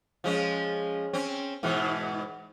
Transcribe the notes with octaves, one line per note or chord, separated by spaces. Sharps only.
F3 G#3 C#4
C4 C#4
G#2 B2 E3